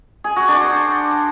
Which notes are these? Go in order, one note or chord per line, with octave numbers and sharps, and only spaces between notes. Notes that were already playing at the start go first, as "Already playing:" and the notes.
G#4
F#4
D4
C5